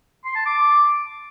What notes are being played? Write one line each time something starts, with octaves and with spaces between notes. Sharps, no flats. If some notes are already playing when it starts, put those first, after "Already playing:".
C6
A5
D6